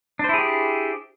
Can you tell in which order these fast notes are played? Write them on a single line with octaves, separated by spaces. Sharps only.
D4 C5 E4 G#4 G4